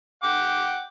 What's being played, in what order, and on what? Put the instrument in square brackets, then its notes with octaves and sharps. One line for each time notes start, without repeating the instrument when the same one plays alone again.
[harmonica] F#5 G5 D6